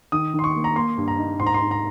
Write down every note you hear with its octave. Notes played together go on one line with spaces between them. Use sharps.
D#3 D#6
D#3
C6
C#6
A#3
A#5
A#3 C6
G2
A#5
D#4
G#2 C6
A#5
C6
G#2
A#5